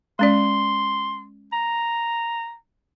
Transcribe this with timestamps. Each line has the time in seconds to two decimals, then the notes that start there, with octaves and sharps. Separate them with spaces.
0.19 G#3 C#4 D5 C6
1.52 A#5